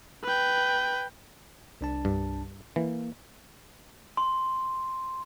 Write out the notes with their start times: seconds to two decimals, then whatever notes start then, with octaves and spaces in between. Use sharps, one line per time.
0.24 B4 G5
1.81 C2 D4 A5
2.05 G2
2.76 E3 A#3
4.17 C6